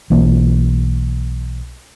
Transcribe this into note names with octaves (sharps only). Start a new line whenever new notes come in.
B1 E3 A#3